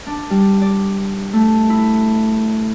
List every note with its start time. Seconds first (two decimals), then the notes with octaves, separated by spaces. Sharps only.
0.06 D4
0.30 G3
0.62 D5
1.33 A3
1.70 E4